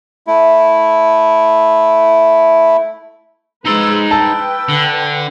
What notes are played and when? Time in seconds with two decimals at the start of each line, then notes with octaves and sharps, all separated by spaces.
0.27 A3 E4
3.66 F3 G#3 D#4 B4 C6 E6
4.11 B4 G5 A5 E6
4.69 D3